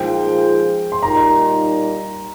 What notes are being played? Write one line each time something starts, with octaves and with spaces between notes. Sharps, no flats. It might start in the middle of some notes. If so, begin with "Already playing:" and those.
Already playing: A#2 F3 G#3 D#4 G#4 G5
C6
A#2 G3 A#3 D#4 A#5